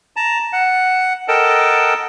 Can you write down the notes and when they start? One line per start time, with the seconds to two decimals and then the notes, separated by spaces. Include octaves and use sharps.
0.16 A5 A#5
0.53 F#5
1.28 A4 A#4 D#5 F#5 G5 A5